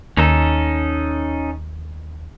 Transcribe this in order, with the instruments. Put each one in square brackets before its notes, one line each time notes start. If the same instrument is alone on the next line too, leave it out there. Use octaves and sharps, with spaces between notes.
[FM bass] D#2 [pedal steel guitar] C#4 D#4 A4